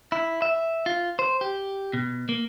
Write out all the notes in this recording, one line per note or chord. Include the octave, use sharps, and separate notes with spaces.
E4
E5
F4
C5
G4
B2
A#3